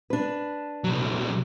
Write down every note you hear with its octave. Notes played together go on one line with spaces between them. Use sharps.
D4 B4
C2 F#3